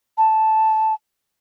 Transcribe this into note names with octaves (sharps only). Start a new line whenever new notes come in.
A5